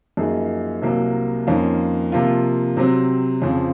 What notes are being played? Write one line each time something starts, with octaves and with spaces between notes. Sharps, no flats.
F#2 F3 A#3 D#4 G#4
C2 C3 F#3 A#3
F2 D#3 A#3 C#4 F4
C3 F3 A#3 F4
C3 F#3 C4
F2 C#3 F3 C4